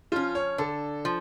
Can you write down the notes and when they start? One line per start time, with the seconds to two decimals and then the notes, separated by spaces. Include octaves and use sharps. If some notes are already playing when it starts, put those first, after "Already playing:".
0.12 F3 C#4 F4
0.35 C#5
0.58 D3 A4
1.05 F3